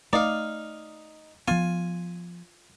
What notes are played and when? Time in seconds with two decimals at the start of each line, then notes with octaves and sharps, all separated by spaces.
0.13 A3 D#4 D5 F5
1.48 F3 B3 F4 G#5